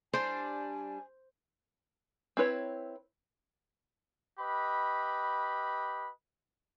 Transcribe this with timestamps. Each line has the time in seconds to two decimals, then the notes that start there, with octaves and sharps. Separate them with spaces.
0.13 G3 D4 C5 G#5
2.37 C4 E4 B4 C#5
4.39 G4 B4 D#5 B5